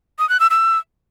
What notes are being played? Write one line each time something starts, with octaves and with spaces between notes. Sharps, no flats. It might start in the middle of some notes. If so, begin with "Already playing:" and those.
D#6
F#6
E6
E6